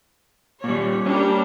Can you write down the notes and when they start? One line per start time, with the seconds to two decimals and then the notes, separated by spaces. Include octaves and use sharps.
0.64 A#2 G3 C#5
1.06 G3 A#3 C#4 D4